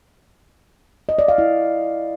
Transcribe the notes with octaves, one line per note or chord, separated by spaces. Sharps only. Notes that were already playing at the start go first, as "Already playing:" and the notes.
D#5
D5
F5
E4